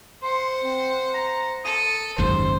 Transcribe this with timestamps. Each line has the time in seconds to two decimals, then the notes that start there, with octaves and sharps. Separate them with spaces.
0.23 C5 F#5 C6
0.62 C4
1.14 A#5
1.64 A4 D#6
2.18 F#1 D#2 G#2 C#4 C5